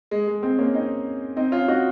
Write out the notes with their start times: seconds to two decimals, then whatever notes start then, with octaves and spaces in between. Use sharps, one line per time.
0.11 G#3
0.28 G#3
0.43 G#3 C4
0.59 A#3 C#4
0.75 C4 D#4
1.37 C4 D#4
1.52 C#4 F4
1.68 D#4 F#4